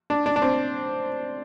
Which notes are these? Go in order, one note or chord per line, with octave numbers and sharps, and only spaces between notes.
D4
D4
D4
C4